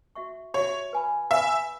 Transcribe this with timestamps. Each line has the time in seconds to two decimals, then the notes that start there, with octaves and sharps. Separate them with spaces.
0.15 F#4 E5 C#6
0.54 F#4 C#5 E5 C#6
0.93 B4 G#5 B5
1.31 B4 E5 G#5 B5